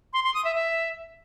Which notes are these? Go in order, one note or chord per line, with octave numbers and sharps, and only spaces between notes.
C6
C6
D#6
E5
E5